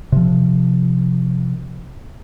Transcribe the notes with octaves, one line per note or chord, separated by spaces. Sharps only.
C3 F3